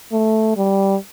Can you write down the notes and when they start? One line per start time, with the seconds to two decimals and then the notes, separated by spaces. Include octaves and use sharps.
0.13 A3
0.57 G3